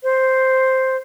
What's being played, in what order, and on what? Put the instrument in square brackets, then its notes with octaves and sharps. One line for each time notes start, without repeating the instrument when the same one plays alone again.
[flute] C5